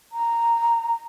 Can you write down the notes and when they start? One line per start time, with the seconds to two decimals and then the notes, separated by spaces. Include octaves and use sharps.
0.12 A#5